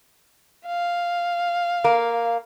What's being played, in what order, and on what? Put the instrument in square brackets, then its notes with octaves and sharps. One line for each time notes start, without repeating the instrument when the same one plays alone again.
[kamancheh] F5
[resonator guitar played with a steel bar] A#3